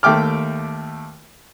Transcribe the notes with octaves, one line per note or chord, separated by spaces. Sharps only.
D#2 A3 E5 G5 D6 F6